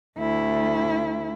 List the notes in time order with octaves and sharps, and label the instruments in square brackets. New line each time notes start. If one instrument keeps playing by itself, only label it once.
[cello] D2 E4